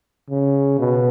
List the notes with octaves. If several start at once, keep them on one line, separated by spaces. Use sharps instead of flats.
C#3
B2